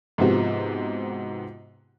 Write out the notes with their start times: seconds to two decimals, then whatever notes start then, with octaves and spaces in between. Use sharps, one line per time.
0.18 G#2 C3 F3 B3 C4 F#4